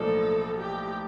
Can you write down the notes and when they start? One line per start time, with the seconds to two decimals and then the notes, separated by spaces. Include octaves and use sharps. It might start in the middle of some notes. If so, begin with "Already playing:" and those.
Already playing: B1 A2 F3 A#3 D4 A4
0.58 G4